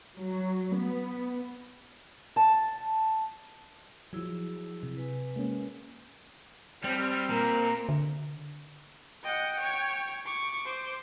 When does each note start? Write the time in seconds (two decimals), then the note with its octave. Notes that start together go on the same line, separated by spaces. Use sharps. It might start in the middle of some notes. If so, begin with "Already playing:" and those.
0.18 F#3
0.75 B3
2.36 A5
4.13 F3 F#3 E4 G#4
4.83 C3
4.97 B4 G#5
5.36 G#3 A#3 C#4
6.84 G3 C4 F6
7.30 A#2 A#4
7.89 D3
9.23 D#5 F#5 G5
9.60 C#5
10.26 C#6 D6
10.65 C5